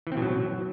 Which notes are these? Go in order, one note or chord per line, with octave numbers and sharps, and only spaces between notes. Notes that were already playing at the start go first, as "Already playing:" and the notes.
E3
C4
B2
F#3